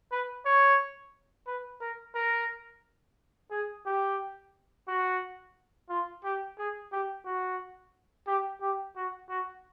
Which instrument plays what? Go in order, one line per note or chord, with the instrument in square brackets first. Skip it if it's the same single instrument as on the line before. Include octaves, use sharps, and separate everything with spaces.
[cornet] B4
C#5
B4
A#4
A#4
G#4
G4
F#4
F4
G4
G#4
G4
F#4
G4
G4
F#4
F#4